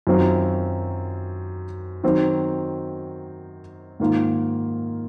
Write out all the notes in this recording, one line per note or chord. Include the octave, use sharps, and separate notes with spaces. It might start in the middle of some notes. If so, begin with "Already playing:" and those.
F#2 D#3 F#3 C4 F4
D#3 F#3 C4 D#4
G#2 D#3 A#3 F4